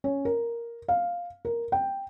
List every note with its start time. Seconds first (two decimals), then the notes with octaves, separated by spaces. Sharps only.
0.04 C#4
0.25 A#4
0.88 F5
1.45 A#4
1.72 G5